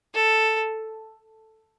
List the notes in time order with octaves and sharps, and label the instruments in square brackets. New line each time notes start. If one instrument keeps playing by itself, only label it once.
[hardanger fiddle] A4